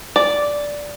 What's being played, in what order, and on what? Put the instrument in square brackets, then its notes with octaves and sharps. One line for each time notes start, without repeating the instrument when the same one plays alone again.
[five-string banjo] D5